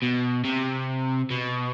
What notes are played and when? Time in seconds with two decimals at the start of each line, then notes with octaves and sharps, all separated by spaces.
0.03 B2
0.45 C3
1.31 B2